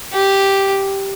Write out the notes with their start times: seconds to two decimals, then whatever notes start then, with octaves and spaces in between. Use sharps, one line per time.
0.13 G4